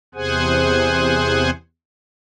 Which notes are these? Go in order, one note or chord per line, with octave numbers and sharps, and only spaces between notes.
E2 C3 G#4 C5 F#5 G#5